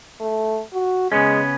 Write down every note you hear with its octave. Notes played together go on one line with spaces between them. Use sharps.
A3
F#4
C#3 G#3 B3 C#4